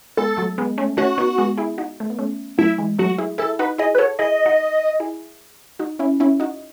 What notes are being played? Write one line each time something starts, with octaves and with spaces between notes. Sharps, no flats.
G#3 B3 A4
F#3 A3
G#3 B3
A3 C#4
A3 C#4 F#4
B3 D#4
G#3 B3
E4 G#4
D#4 F#4
A3
B3
A3 C#4
F#3 A3 E4
E3 G#3
F#3 A3 F#4
E4 G#4
E4 G#4 A4
D#4 F#4 B4
E4 G#4 D#5
B4
F#4 A4 C#5
E4 G#4 D#5
D#4 F#4
E4 G#4
D#4 F#4
C#4 E4
C#4 E4
D#4 F#4